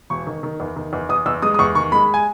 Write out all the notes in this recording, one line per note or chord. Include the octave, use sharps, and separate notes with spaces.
E1 C#6
D#3
D#3
E2
D#3
E2
E2 D#6
E2 E6
G#3 D#6
D#6
E2 C#6
D#3 C#6
G#3 B5
G#5